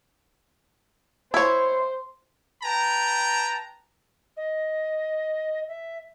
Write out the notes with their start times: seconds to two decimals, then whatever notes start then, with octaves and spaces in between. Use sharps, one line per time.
1.34 E4 C5 C#5
2.62 B4 G5 A5 A#5
4.36 D#5
5.68 E5